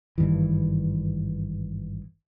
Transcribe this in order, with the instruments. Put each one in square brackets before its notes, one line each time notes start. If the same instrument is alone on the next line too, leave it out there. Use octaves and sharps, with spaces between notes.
[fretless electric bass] G#1 G2 D#3 E3